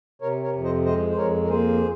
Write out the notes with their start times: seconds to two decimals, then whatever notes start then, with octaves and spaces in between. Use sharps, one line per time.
0.21 C3 A#4 C#5
0.43 A#4 C#5
0.54 F2
0.64 C5 D#5
0.85 G#3 C5 D#5
1.10 C5
1.17 F2 A#4 C#5
1.44 A#4
1.49 A#3 G#4 C5